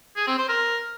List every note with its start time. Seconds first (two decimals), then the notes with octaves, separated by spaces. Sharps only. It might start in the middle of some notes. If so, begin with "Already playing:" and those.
0.16 G#4
0.27 C4
0.38 C5
0.49 A#4